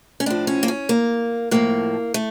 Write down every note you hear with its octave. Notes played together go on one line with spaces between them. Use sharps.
C#4
A2 F3 D4
C#4
A#3
C#4
A#3
A2 F3 A#3
A3